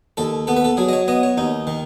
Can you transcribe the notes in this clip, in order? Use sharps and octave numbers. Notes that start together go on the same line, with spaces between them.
D#2 A4
B3 A4
B4
A4
F#3 G#4
D#5
C#5
B3 D#5
C#5
D#2 D#4
D#3